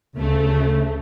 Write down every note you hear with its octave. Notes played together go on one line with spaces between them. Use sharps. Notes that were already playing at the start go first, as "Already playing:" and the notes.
D2 C#3 A3